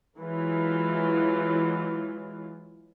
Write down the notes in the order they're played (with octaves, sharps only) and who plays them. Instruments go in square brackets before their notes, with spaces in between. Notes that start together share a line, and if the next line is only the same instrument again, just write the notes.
[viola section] E3 F#3 G#3 F4